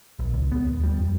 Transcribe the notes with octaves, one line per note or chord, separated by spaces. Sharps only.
A#1
C#2
B3
D#2
G3
F2